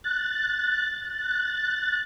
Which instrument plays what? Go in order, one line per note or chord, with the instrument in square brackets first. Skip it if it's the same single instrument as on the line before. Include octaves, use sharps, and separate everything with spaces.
[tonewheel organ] F#6 A6